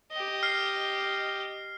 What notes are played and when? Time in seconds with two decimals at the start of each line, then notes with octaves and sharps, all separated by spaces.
0.12 G4 D#5
0.43 F6 C7